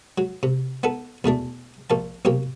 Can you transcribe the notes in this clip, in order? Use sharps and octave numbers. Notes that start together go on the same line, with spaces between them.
F#3
C3
B3 D#4 A4
E2 B2 A3 D4
A#1 A#3 A5
B1 C3 A#3 G4